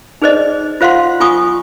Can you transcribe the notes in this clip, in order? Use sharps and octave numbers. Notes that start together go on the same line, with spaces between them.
D#4 G#4 B4 C5 D5 D#5
F4 C5 F5 F#5 C6
F4 G#5 C#6 D#6